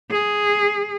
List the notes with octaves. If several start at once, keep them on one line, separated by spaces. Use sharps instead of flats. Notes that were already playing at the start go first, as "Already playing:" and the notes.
G#4